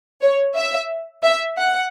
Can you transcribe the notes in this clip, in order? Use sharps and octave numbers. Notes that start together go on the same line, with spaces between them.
C#5
E5
E5
F#5